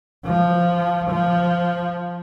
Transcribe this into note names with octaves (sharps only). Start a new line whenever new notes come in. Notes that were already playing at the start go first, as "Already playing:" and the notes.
F3
F3